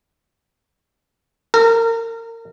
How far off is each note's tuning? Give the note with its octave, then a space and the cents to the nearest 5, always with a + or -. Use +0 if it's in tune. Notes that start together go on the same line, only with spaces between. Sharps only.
A#4 -30